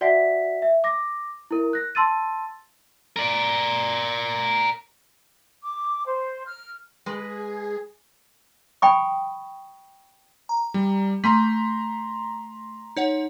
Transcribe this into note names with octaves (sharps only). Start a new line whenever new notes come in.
F#4 D5 E5 F#5 G#5 B6
E5
D6 A#6
E4 A#4
F#6 A#6
A5 C6 E6 A6 D#7
A#4 D5
D6
C5
F6
G#3 G#4 B4
G5 G#5 B5 C#6 D#6
A#5
G3
A3 A#5 C6 B6
D#4 C#5 F#5